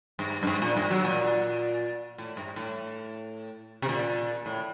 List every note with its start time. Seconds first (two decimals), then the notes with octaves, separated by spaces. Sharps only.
0.19 G2
0.43 F#2
0.47 G2
0.62 A#2
0.77 G2
0.91 F#3
1.04 A#2
2.18 A2
2.37 G2
2.56 A2
3.82 C3
3.89 A#2
4.46 A2